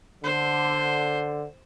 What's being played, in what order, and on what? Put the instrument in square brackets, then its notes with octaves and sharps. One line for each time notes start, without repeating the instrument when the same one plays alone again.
[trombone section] D3 [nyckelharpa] C5